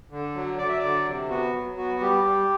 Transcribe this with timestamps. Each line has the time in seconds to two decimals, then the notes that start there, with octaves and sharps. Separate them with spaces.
0.10 D3
0.35 F#3
0.58 F#3 D5
0.68 E5
0.78 D3 D5
1.05 C3
1.29 B3 F#4
1.53 F#3
1.77 B3 F#4
2.00 G3 G4
2.25 G3